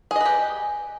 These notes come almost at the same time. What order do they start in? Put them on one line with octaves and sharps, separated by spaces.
G#4 D#5 B4 G4